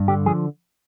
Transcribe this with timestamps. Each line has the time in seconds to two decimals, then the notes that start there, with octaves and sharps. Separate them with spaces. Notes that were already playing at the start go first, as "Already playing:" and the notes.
Already playing: G2
0.08 D3 G4
0.26 F3 G#4